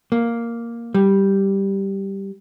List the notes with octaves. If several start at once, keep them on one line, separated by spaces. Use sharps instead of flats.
A#3
G3